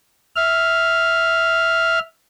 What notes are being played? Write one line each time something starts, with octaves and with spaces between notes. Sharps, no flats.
E5 F6